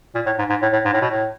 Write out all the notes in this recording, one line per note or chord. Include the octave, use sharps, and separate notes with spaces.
A#2
A2
G#2
G#2
A2
A2
G#2
A2
B2
A2